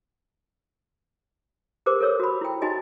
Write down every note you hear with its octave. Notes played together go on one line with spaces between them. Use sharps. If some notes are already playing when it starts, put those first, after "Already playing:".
G4 A#4 C5 D6
A4 A#4 C#5 E6
F#4 B5
E4 G5
D#4 F#4 D#5 G#5